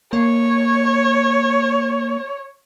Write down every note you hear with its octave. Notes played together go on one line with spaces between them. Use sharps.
A#3 C#5